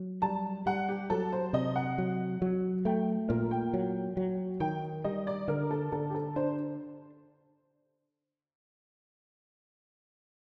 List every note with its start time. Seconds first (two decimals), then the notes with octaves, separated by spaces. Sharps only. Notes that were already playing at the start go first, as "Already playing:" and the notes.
Already playing: F#3
0.22 G3 A5
0.66 G3 F#5
0.89 G4
1.10 F#3 A4
1.32 C5
1.53 C3 D#5
1.76 F#5
1.98 F#3
2.42 F#3
2.85 A3 G5
3.29 A#2 A#4
3.51 G5
3.74 F#3
4.17 F#3
4.60 D#3 G5
5.04 G3 D#5
5.27 D5
5.48 D3 A#4
5.71 A4
5.92 D3 A4
6.10 G4
6.15 A4
6.36 D4 C5